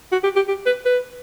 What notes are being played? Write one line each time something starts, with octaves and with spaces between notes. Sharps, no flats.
F#4
G4
G4
G4
B4
B4